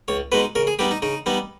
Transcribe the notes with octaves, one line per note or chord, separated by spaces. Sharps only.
C#2 C#5
B2 G#3 D#4 B4
C#3 A#4
G#4
G3 B3 D#4 G4
D#4
C#3 D#4
G3 B3 D#4